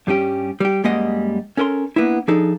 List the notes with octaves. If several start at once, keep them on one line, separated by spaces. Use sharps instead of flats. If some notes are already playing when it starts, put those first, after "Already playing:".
G2 G3 C#4 G4
G3 G4
F#2 G3 G#3 A#3 D#5 F#5
C#4 A4 A#4 G#5 C6
A#3 B3 D4 E4
F3 D4 D#4 G#4 A4